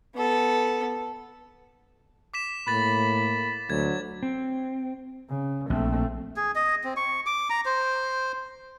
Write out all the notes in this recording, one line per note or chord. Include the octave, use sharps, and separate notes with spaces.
B3 A4
D6 B6 E7
A2 A#3 B5 A6
D2 F#3 G#6
C4
C#3
A#1 A3 C4
G#4
D#5
C4
C#6
D6
A#5
C5